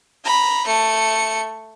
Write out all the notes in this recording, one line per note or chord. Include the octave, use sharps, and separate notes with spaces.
A#5 B5
A3 C#7